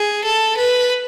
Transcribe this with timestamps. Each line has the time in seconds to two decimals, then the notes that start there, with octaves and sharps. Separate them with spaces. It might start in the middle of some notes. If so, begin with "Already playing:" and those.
Already playing: G#4
0.24 A4
0.57 B4